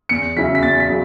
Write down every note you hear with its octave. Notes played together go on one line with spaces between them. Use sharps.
E2 C#7
C#3 F#3 C#4 E4 B6
B6
E2 A6
B6
C#3 F#3